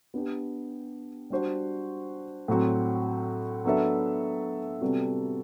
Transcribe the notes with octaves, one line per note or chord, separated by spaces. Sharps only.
B3 D4 G4
G3 D4 F#4 C5
A2 F#3 C4 F#4
F#3 B3 D4 A4 E5
C3 G3 B3 F#4 A4